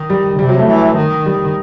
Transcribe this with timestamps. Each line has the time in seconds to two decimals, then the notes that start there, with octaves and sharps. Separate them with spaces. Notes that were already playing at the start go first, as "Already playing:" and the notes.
Already playing: D#3
0.10 G3
0.39 C3 G3
0.49 F#3
0.59 A3
0.69 E3
0.97 D#3
1.26 G3